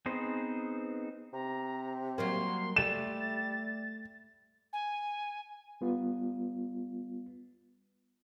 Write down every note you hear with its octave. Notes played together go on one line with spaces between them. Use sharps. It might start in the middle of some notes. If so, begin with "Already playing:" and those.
B3 C4 D#4 G#4 C5
C3 A#5
F#3 G3 A#3 C6
G3 A3 A6 E7
G#5
G3 B3 F4